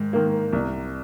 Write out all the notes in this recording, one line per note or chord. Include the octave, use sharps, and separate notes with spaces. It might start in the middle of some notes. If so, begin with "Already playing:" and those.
Already playing: G#2 D#3
D#3 A#3
C2